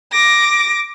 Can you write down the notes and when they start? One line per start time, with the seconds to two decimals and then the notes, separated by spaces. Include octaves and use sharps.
0.12 D6 A#6